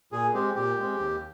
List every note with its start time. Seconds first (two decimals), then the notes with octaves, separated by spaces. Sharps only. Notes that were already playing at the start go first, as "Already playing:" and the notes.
0.12 A#2 G#4
0.33 G#3 C4 G4
0.55 A#2 G4
0.77 G#3 C4
0.99 D#2